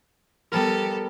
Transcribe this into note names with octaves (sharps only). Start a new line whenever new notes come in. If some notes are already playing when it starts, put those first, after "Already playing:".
G3 B3 G4 A4 A#4